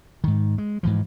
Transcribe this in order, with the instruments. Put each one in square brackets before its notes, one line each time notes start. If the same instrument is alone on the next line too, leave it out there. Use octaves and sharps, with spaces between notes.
[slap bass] G#2 D#3
G#3
G#2 E3 F3